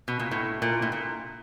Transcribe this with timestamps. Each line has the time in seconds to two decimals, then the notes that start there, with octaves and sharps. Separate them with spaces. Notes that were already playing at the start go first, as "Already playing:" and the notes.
0.08 B2
0.19 A#2
0.31 A2
0.62 A#2
0.82 A2
0.92 A#2